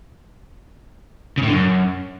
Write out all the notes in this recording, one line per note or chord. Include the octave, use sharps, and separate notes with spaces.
C#3
A2
D3
F#2